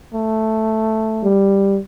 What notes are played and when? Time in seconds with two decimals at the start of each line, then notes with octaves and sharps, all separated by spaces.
0.12 A3
1.24 G3